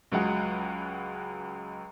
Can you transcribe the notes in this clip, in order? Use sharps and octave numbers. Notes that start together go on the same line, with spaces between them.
C#2 F#3 G#3 F#5